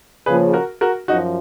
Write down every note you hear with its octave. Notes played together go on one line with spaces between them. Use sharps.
C#3 F3 A#3 G#4 B4
F#4 A#4
F#4 A#4
F#2 F3 D#4 F#4